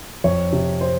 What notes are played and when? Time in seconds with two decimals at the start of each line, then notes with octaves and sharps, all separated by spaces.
0.24 F2 C#5
0.52 C3
0.81 C5